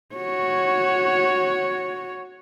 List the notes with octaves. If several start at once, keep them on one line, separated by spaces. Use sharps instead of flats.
F#4 C#5